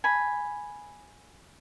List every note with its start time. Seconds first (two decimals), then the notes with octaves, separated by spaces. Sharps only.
0.04 G#5 B5